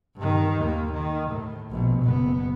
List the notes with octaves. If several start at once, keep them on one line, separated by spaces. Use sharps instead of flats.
G2 D#3
D#2 A#3
D#3
A2
A#1 B2
F#1 B3